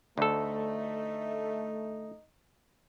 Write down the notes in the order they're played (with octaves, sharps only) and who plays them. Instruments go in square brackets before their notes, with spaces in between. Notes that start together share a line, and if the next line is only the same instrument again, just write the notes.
[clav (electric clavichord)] D2 A4 [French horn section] A3 [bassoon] D#4